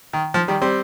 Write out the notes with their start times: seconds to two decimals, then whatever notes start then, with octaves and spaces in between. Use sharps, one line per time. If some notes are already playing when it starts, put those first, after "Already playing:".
0.13 D#3
0.34 F3
0.48 D#3 G3
0.62 G3 C4